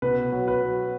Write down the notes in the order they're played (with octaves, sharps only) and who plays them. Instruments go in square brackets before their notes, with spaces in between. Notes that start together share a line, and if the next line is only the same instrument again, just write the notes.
[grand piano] B2 B4
F#3
B4
F#3